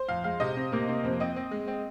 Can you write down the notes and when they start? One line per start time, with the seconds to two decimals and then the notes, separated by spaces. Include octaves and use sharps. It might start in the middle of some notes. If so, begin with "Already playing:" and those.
Already playing: C5
0.08 F2 F5
0.24 G#3 F5
0.40 C3 D#5
0.56 C3 C4
0.72 C3 A#3
0.88 C3 C4
1.04 F2 C4
1.20 C4 D#5
1.36 C4
1.51 G#3
1.67 C4